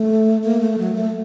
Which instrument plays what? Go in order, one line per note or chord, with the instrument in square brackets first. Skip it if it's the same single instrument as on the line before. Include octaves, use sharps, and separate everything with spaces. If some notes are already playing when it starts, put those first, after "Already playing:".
Already playing: [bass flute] A3
A#3
A3
F#3
A3